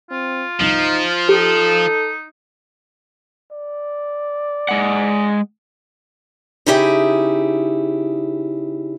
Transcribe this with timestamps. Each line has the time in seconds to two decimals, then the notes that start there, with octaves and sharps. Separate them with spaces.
0.11 C4 F4
0.61 G1 C2 F3 D#4
1.29 D#4 G4 A4
3.51 D5
4.69 G#3 F#5
6.66 C#3 D#4 E4 G4 G#4